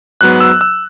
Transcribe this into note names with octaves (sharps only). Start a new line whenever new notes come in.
G#2 F#3 B3 F#6
E6
E6